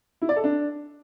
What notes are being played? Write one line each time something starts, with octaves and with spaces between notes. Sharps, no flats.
E4
D5
A4
D4